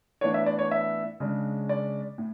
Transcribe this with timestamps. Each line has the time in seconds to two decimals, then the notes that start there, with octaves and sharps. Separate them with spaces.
0.21 A2 E3 B3 D4 C#5
0.34 E5
0.46 D5
0.59 C#5
0.71 E5
1.20 C#3 G#3 D4
1.69 D5
2.18 A2